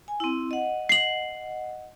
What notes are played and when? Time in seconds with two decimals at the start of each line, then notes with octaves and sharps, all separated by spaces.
0.08 G#5
0.20 C4 E4
0.51 D#5 F#5
0.89 C7 F#7